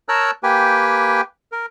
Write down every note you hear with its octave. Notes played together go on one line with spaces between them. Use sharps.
A#4 C#5 A5 A#5 E6 F#6
A#3 G4 B4 G5 G#5
A#4